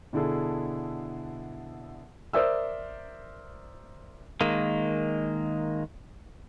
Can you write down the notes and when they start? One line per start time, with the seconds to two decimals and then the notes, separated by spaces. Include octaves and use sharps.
0.13 B2 D3 E4 G#4 A4
2.33 A#4 C5 D5 E5 D#6 E6
4.41 D#3 G#3 A#3